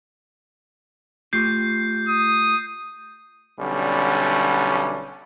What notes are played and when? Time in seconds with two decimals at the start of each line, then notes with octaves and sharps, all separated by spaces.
1.33 A3 F4 G4 G6 C7
2.08 D#6
3.59 B1 D3 G3 C#4